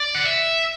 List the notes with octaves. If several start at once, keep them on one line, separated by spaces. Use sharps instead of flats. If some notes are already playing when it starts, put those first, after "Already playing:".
Already playing: D5
F#5
E5